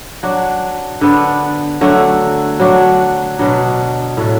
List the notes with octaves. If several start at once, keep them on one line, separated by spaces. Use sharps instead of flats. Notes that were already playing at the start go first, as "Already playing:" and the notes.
F#3 D4 F#4
D3 B3 D4
D3 F#3 A3 F#4
F#3 D4 F#4
B2 F#3 D4
A2 F#3 A3